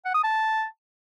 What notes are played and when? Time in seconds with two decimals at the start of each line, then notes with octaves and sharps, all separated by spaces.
0.05 F#5
0.14 D#6
0.24 A5